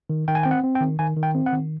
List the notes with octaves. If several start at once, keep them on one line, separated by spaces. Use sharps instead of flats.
D#3
D#3 G5
G#5
C4 G5
F#5
C4
G5
D#3
D#3 G#5
D#3
G5
C4
F#5
D#3